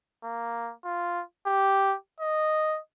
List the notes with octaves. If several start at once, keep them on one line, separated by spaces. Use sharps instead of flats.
A#3
F4
G4
D#5